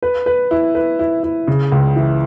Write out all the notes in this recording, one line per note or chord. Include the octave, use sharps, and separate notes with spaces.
B4
B4
E4
B4
E4
E4
C#3
C#2
E3